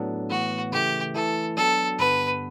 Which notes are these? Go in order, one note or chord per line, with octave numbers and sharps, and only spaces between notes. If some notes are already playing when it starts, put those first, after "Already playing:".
Already playing: A2 F#3 B3 D4 A4
A2 E3 B3 F#4
C#3 E3 A3 G4
E3 A3 E4 A4
F#3 B3 D4 F#4 A4
G2 D3 G3 B3 B4